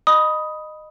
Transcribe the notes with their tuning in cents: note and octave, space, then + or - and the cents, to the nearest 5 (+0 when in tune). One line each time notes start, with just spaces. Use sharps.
D#5 -20 B5 +0 D#6 +10